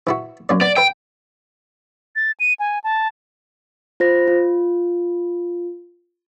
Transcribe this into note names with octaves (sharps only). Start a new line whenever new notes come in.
E3 E4 F#4
F#2 A#3 D5
B3 D5
B4 E5 G5
A6
D#7
G#5
A5
F4 C5 A#6
F4